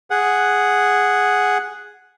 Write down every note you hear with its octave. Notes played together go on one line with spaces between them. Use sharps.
G#4 F#5